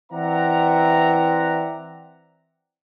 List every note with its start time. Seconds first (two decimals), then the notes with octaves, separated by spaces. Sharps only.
0.12 E3 C4 D5 E5 F#5 A#5